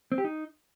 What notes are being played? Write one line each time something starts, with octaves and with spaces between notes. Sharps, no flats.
C4
G4
D#4